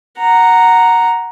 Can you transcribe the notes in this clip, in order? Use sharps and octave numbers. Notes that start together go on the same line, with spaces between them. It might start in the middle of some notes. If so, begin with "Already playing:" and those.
F#5 A#5